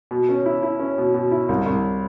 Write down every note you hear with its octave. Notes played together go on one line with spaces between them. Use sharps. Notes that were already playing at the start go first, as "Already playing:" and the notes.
B2
C#4
E4
E4
C#4
B2
B2
E4
C2
C2